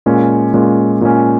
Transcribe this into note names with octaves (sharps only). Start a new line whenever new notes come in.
A#2 G#3 C#4
A#2 G#3 C#4
A#2 G#3 C#4